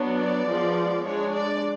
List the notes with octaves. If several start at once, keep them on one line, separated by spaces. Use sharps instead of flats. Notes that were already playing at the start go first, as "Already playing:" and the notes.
Already playing: F#3 B3 D4
D5
F3 G#3 B3
G#3 D4 C#5
D5